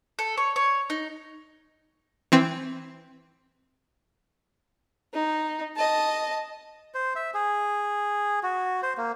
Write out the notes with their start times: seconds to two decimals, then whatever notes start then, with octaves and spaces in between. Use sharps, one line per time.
0.19 A4
0.37 C#5
0.56 C#5
0.90 D#4
2.32 E3 C4
5.14 D#4
5.76 D#5 A5
6.94 C5
7.16 E5
7.34 G#4
8.43 F#4
8.83 C5
8.98 A#3